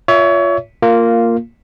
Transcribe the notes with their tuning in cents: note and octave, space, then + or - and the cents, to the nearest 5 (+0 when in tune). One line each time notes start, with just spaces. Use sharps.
F4 +0 C#5 +30 E5 +0
A#3 -10 F4 +0